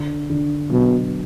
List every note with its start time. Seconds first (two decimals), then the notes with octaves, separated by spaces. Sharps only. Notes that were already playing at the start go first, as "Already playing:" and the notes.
Already playing: D3
0.30 D3
0.71 B2 F#3